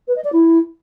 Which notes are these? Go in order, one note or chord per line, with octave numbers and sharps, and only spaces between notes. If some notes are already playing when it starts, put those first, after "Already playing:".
B4
D#5
D5
E4